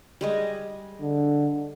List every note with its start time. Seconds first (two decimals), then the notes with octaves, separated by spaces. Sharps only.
0.21 G3 G#3 D#5
1.01 D3